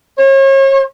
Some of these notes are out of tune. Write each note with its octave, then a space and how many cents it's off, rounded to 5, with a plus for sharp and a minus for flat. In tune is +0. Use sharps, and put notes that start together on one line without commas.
C#5 -40